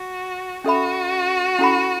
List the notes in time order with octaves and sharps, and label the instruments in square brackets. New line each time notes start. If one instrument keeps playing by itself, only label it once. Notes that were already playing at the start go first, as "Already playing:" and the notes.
Already playing: [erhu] F#4
[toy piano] C#4 A4 E5 B5 [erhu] F#4
[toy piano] C#4 E4 A4 F#5 B5